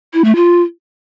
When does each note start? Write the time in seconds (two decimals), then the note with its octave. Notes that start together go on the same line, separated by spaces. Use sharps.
0.14 E4
0.25 A3
0.36 F4